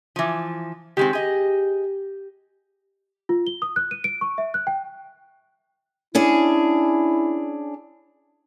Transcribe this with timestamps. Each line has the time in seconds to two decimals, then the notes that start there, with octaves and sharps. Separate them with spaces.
0.16 E3 F3
0.97 D#3 G#3 C4 G4
1.13 G#4 D#5
3.29 F4
3.47 G7
3.62 D#6
3.76 F#6
3.91 D#7
4.04 D7
4.21 C#6
4.38 E5
4.54 F#6
4.67 G5
6.15 C#4 D4 E4 G#4